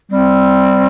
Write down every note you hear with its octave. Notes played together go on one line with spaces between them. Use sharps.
G3 C4